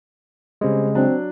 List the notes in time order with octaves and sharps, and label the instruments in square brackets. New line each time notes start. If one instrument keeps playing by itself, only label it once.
[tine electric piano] C#3 G#3 [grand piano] G3 C4 C#4
[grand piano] F#3 D4 [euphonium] C4